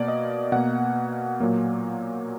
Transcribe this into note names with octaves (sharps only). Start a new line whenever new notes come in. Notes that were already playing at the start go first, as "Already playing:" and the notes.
Already playing: B2 A#3 D5
D#5
B2 A#3 F#5
A#2 F#3 A#3